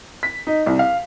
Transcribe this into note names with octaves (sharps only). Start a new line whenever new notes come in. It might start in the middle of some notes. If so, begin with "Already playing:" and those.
B6
D#4
C2
F5